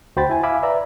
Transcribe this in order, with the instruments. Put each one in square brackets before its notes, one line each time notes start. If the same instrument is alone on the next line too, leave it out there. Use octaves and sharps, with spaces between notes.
[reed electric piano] D2 F#4 C5 G5 B5 A6
E4 G#5
E5 F5 G#5 B5 D6 E6
B4 D5 E5 A#5 B5